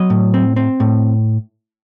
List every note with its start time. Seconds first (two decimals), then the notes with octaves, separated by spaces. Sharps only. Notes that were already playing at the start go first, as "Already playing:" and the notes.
Already playing: F#3 D#5
0.10 A2
0.34 C4
0.56 C4
0.80 A2